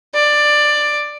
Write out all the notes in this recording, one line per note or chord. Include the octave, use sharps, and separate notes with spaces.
D5